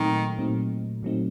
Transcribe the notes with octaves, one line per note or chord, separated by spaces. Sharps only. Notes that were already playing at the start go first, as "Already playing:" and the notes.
Already playing: A#2 D#3 F#3 A3 C4 D#4
A#2 F#3 A3 C4 D#4
A#2 F#3 A3 C4 D#4